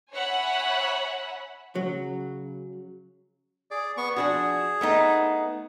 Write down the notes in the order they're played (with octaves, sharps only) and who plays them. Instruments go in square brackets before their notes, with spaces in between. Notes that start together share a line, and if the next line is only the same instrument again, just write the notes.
[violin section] C#5 E5 F#5 G#5 B5
[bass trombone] C#3 [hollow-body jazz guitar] F#3
[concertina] G#4 D5
B3 C#6
[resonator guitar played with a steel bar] F3 D4 F#4 [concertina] G#4
[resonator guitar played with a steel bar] A3 B3 D#4